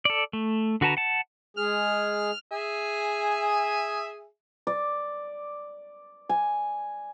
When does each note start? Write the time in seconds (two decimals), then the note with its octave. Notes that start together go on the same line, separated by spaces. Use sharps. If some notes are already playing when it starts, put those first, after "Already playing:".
0.05 A4 D5
0.33 A3
0.81 D3 F#4 B4 A5 A#5
0.97 F#5 A5
1.57 G#3 G#4 F6
2.51 G#4 E5 G#5
4.67 D5
6.29 G#5